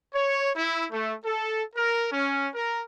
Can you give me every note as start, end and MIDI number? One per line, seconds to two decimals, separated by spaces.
0.14 0.50 73
0.56 0.85 64
0.92 1.14 57
1.25 1.63 69
1.76 2.08 70
2.12 2.48 61
2.54 2.81 70